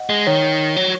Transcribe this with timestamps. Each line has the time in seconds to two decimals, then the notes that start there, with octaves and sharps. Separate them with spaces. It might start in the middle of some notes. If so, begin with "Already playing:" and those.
Already playing: D#5 F#5
0.10 G#3
0.27 D#3 C#5
0.76 F#3